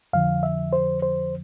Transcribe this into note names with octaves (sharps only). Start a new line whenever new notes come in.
F2 D3 F3 F5
E5
C5
C5